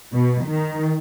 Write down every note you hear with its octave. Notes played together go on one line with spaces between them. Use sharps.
B2
D#3